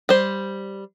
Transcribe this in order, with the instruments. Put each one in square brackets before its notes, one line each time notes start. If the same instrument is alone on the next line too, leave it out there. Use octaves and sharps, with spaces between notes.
[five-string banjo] G3 C5